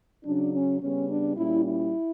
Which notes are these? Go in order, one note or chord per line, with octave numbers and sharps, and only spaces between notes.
C#3 F#3 C#4 D4
C#4
C#3 G3 B3 C#4
D4
A#2 G3 C#4 E4
E4